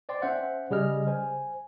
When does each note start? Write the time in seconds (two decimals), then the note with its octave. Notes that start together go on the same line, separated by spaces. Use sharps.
0.09 C5 D5 G5 C6
0.22 C#4 C5 E5 F#5
0.71 C#3 G3 G#4 D#5 F6
1.07 C5 G#5